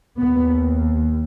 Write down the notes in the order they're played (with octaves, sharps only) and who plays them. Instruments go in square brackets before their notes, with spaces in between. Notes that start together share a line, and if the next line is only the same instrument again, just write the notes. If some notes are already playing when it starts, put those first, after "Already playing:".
[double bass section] D#2 B3